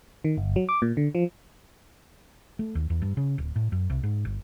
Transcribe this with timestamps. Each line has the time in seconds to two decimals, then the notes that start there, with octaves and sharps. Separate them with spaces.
0.24 D#3
0.37 G1
0.56 F#3
0.69 D6
0.82 A#2
0.97 D3
1.15 F3
2.59 A3
2.75 D#2
2.90 E2
3.02 G2
3.17 C#3
3.38 D1
3.56 A2
3.72 F#2
3.90 C2
4.03 G#2
4.25 G1